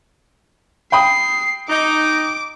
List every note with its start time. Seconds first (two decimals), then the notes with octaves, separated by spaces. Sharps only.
0.92 G5 B5 D#6 C7
1.69 D#4 D6